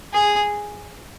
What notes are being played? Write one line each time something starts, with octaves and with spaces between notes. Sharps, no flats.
G#4